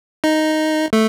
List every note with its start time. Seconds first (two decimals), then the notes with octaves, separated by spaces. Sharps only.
0.24 D#4
0.93 A3